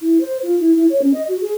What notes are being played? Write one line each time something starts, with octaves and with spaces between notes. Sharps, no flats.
E4
C5
F4
E4
E4
C#5
C#4
D#5
F#4
G#4